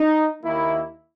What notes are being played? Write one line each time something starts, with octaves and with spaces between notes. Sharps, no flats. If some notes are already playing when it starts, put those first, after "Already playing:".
Already playing: D#4
D#2 D#3 A#3 E4